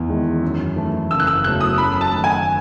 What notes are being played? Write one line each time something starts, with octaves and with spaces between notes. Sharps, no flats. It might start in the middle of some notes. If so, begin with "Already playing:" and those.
Already playing: E2
D#3 G#3
F#2
E3 A3 E4
F#1 E6
F#6
E6
E2 C#3 F#3 A3 F#6
D#6
F#2 B5
A5
D#3 A3
G#5